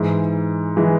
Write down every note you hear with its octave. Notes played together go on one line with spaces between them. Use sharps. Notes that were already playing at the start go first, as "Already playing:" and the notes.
Already playing: G#2 E3 G#3
E3 G#3